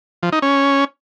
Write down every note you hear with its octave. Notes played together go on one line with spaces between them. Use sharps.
F3
D#4
C#4